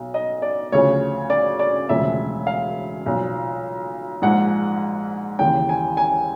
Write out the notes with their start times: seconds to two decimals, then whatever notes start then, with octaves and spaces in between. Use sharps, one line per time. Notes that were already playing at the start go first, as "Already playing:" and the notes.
Already playing: B1 B2
0.14 D#5
0.42 D5
0.72 D2 C#3 F3 C#5
1.30 D5
1.59 D5
1.89 E1 D2 C#3 F3 E5
2.47 F5
3.06 B1 A#2 F3
4.22 A#1 G#2 F3 F#5
5.39 D#2 C#3 E3 G5
5.69 G#5
5.97 G#5